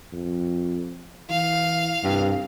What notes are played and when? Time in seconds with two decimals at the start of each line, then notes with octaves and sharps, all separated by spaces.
0.13 F2
1.30 E3 F5
2.04 C2 G2